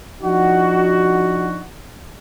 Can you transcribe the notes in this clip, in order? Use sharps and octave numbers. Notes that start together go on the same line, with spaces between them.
F3 D4 D#4 F#4